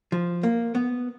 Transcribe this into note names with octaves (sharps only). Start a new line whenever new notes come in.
F3
A#3
B3